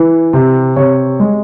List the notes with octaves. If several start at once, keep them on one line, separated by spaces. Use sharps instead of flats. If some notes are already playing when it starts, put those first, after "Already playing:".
Already playing: E3
C3
C3 C#5
G#3